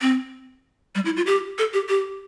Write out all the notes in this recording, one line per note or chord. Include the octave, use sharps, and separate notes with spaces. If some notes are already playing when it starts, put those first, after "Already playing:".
C4
G3
E4
F4
G4
A4
G4
G4